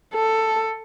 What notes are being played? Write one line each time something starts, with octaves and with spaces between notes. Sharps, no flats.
A4